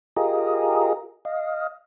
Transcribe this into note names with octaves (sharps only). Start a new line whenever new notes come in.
F4 G4 G#4 A#4 D#5
D#5 F5